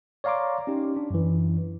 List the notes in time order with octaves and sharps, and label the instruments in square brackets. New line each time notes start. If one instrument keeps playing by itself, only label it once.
[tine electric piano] C#5 D5 F5 A#5 C6 D6
C#4 D#4 G4
D4
F#2 E3